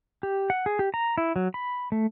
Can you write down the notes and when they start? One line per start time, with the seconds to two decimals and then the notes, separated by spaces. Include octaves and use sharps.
0.23 G4
0.50 F#5
0.66 G#4
0.79 G4
0.94 A#5
1.18 E4
1.36 F#3
1.54 B5
1.92 A3